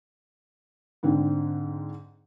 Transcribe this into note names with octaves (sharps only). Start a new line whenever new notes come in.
G#2 D3 C4